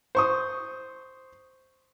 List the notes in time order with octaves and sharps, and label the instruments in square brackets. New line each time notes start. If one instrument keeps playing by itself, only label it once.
[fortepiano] C5 C#6 D#6